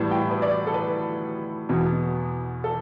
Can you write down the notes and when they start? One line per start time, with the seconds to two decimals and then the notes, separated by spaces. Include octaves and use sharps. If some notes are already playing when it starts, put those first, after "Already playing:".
Already playing: A2 E3 G3 B3 A5
0.11 G5
0.31 B4
0.42 D5
0.67 A4
0.74 B4
1.69 E2 B2 B3
2.64 A4